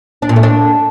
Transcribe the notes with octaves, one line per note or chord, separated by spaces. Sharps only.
D4
A#2
A3
D4